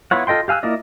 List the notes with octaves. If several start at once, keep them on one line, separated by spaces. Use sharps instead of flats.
B3 E4 F4 C#5 F#5
F4 A4 D#5 G5 C6
G4 F5 G#5 E6 F#6
A#3 E4 F4 D5 D#5